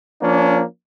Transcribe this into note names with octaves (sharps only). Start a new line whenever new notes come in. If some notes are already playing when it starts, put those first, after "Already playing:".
F3 A#3 C#4 D4